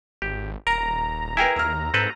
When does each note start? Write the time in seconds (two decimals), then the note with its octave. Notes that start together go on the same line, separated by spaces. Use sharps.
0.22 G#1 G4
0.67 D#1 A#4 A#5
1.37 E4 G#4 A#4 B4 G5 G#5
1.56 D#2 E6 F6
1.94 G#2 C4 A4 B4